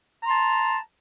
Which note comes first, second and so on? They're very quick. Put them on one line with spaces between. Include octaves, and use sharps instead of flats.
A#5 C6 A5